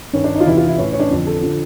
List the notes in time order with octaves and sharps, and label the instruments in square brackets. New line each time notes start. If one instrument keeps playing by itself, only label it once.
[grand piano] G2 D#3 C#4
D4
D#4
F4
E2 C3 E3 E4
F4
E4
A2 E3 C#4
C#4
D4
F2 D3 F3
A4
D3 F3